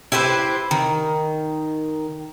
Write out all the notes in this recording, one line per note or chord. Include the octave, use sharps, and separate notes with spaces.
E4 G4 B4 C5
D#3